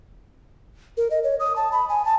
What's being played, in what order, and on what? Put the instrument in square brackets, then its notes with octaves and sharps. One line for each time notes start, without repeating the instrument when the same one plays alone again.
[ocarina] A#4
D#5
C#5
D#6
A5
B5
G#5
A5